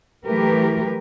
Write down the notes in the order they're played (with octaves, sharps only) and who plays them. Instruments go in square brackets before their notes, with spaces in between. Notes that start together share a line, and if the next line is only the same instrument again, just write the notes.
[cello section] E3 F#3 A3 G4 A#4 B4